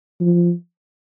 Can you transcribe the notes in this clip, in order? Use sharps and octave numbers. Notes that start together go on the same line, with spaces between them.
F3